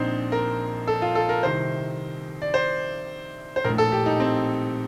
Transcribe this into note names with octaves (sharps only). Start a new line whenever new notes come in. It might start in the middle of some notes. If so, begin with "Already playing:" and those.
Already playing: A#1 A#2 C4 D4 D#4 C5
A#4
A4
F4
A4
A#4
C2 C3 D#3 C5
D5
C5
C5
A#1 A2 A#4
A4
G4
D#4
C4